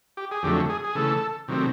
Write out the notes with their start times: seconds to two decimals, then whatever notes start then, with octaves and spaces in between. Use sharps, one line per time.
0.17 G4
0.31 G#4
0.43 F2 D3 F#3 A3 G4
0.69 G#4
0.84 G#4
0.95 C#3 E3 A3 A4
1.48 C3 D#3 F#3 A3 C4